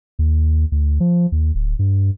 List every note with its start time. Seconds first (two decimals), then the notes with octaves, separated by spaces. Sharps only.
0.19 D#2
0.72 D2
1.00 F3
1.32 D#2
1.55 D1
1.79 G2